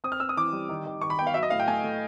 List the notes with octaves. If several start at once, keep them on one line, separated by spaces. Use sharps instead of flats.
C4 D#6
F6
C4 E6
D#6
E3 D6
G3
D#3
D#3
D#3 C#6
B5
B3 G5
F5
F#3 E5
D#5
A2 F5
G5
A3 G#5
A3